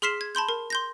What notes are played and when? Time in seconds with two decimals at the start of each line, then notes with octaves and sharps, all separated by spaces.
0.02 G#4 C6 F6 B6 C7 E7
0.21 G#6
0.35 A5 B5 C6 G6
0.49 A#4
0.70 C6 G6 A#6